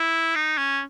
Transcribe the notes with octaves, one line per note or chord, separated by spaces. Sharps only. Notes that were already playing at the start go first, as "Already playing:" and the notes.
Already playing: E4
D#4
C#4